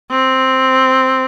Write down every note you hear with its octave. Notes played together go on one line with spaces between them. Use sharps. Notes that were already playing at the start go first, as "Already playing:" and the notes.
C4